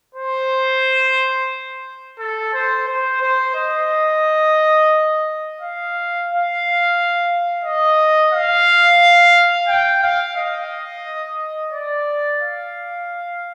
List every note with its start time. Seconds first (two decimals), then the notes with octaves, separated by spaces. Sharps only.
0.15 C5
2.19 A4
2.54 C5
2.88 C5
3.22 C5
3.55 D#5
5.61 F5
6.28 F5
7.64 D#5
8.33 F5
9.68 G5
10.03 F5
10.36 D#5
11.72 D5
12.41 F5